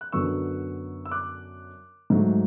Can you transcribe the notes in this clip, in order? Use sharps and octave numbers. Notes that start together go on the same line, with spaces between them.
F#6
F#2 D3 F#3 B3 C#6 E6
E6
D6 F#6
G#2 F#3 A3